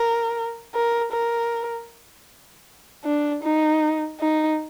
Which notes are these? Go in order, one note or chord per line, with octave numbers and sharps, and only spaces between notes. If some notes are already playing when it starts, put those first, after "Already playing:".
Already playing: A#4
A#4
A#4
D4
D#4
D#4